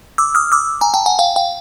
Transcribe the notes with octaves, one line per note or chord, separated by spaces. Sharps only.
D6 E6
D#6 F6
D6 E6
G#5 A#5
G5 A5
F#5 G#5
F5 G5
F5 G5